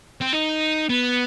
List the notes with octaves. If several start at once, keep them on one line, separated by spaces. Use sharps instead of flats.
C4
D#4
B3